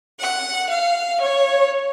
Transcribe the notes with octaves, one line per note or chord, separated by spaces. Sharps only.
F#5
F5
C#5